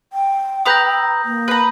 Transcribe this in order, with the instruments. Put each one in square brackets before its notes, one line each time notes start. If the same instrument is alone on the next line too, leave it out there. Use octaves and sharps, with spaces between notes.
[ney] G5
[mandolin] B4 A#5 E6 [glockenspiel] D#6 G6 A#6
[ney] A#3
[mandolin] B4 A#5